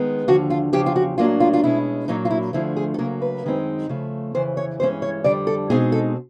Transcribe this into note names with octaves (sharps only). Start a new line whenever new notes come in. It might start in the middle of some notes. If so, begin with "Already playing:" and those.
Already playing: D#3 G#3 B3
D#2 D3 F3 F#4
F4
E2 C#3 F3 G4
F4
F#4
A2 F#3 A#3 D4 F4
F4
F4
B2 G#3 C#4 E4
A#2 F#3 A#3 D#4
F4
E4
D2 D3 F3 A3 E4
G#4
A4
C#3 F#3 A#3 A#4
B4
F#2 D#3 G#3 C4 D#4
C#3 F3 A3
F2 C#3 E3 C5
C#5
G2 E3 G#3 C#4 C5
C#5
F2 D3 G3 D5
A4
B2 G#3 C4 D#4 G#4
A4